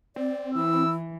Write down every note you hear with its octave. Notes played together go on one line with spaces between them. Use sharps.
C4 D5
E3 E4 E6